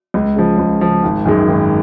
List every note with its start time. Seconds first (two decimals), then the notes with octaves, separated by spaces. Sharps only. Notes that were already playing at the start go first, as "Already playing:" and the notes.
0.14 C#2
0.36 C#3 F3
0.58 C#2
0.81 C#3 F3
1.03 G#1
1.26 F#2 D#3 G#3
1.48 G#1